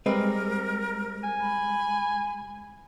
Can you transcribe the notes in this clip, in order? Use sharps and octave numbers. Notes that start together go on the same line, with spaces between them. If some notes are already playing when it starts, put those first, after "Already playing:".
G3 G#3 C4 A#4 B4
G#5
B5